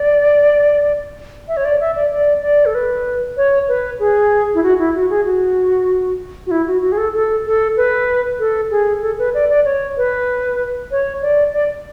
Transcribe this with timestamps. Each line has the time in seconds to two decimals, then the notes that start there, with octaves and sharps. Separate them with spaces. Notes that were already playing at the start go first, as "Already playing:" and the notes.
Already playing: D5
1.48 E5
1.57 C#5
1.65 D5
1.80 E5
1.95 D5
2.12 D5
2.42 D5
2.66 A4
2.75 B4
3.37 C#5
3.68 B4
3.99 G#4
4.54 E4
4.63 F#4
4.79 E4
4.95 F#4
5.10 G#4
5.25 F#4
6.47 F#4
6.51 E4
6.66 F#4
6.82 F#4
6.92 G#4
6.98 A4
7.14 A4
7.46 A4
7.77 B4
8.39 A4
8.71 G#4
9.02 A4
9.19 B4
9.34 D5
9.49 D5
9.65 C#5
9.97 B4
10.91 C#5
11.22 D5
11.53 D5